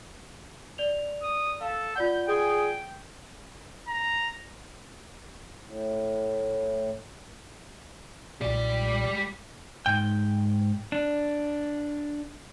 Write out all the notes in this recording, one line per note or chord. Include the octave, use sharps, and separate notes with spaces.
D5 F7
D#6
A4 F5
F4 D5 F#5 G6
G#4 G5
A#5
A2
B1 A#2 G3 D5
G#2 G5
D4